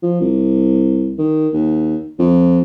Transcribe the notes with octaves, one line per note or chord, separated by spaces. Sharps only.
F3
C2
D#3
D#2
F2